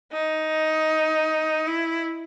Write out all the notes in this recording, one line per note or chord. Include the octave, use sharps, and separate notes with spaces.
D#4
E4